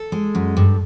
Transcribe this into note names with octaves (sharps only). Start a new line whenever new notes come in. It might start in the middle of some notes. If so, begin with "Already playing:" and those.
Already playing: A4
G#3
F#2
G2